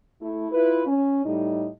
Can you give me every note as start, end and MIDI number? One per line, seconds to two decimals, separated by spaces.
0.21 0.47 57
0.21 0.47 64
0.52 0.85 64
0.52 0.85 65
0.52 0.85 71
0.86 1.23 61
1.25 1.68 45
1.25 1.68 55
1.25 1.68 63